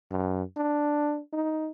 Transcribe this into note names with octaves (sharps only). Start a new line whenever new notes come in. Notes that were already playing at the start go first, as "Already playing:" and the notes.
F#2
D4
D#4